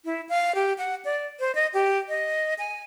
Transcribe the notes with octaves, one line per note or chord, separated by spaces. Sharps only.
E4
F5
G4
F#5
D5
C5
D#5
G4
D#5
G#5